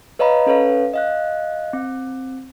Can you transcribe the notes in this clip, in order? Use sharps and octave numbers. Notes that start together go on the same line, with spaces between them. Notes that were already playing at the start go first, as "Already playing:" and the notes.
B4 C#5 D#5 F5 A#5 B5
C#4 A4 B4 C#5 F5
D#5 F5 F#6
C4